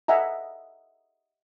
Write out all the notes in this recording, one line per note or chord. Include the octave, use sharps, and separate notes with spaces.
D#5 E5 F#5 G#5 A#5